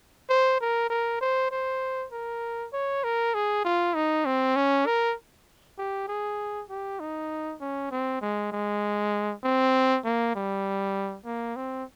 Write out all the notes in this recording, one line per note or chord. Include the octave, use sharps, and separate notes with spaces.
C5
A#4
A#4
C5
C5
A#4
C#5
A#4
G#4
F4
D#4
C4
C#4
A#4
G4
G#4
G4
D#4
C#4
C4
G#3
G#3
C4
A#3
G3
A#3
C4